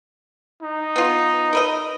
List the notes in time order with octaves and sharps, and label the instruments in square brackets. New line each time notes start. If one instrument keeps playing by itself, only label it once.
[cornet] D#4
[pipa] B3 F4
A#4 B4 D#5